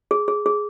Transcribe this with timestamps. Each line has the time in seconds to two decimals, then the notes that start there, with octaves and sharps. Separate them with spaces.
0.11 G#4
0.28 G#4
0.46 G#4